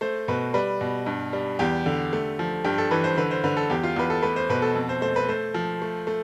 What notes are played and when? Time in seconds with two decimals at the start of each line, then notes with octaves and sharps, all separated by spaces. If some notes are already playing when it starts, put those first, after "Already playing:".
0.01 A3 C5
0.28 B2 B4
0.54 G3 B4
0.81 B2
1.06 G2
1.33 G3
1.59 E2 G4
1.86 D3
2.13 A3
2.39 F3
2.64 G2 G4
2.78 A4
2.91 E3 B4
3.04 C5
3.17 D3 B4
3.31 C5
3.44 D3 B4
3.57 A4
3.70 E2 G4
3.83 F4
3.96 E2 B4
4.10 A4
4.23 A3 B4
4.36 C5
4.50 B2 B4
4.62 A4
4.75 F2
4.89 C5
5.02 A3 C5
5.16 B4
5.29 A3 C5
5.54 F3
5.82 A3
6.07 A3